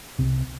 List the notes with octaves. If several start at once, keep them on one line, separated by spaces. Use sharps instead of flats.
C2 C3 C4